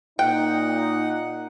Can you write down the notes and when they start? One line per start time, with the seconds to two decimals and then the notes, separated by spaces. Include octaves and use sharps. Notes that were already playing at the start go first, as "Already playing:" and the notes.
0.19 A#2 D#4 F#5 G5